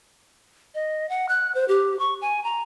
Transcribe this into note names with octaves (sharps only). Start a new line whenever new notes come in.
D#5
F#5
F#6
C5
G4
C#6
G#5
A#5